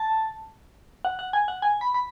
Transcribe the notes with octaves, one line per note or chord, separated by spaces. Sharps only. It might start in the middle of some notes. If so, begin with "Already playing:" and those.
Already playing: A5
F#5
F#5
G#5
F#5
G#5
B5
B5